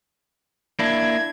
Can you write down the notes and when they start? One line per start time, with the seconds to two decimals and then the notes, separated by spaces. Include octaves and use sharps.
0.79 A#3 D4 E4 G#6